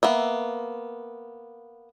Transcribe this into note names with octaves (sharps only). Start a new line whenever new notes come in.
A#3 B3 E5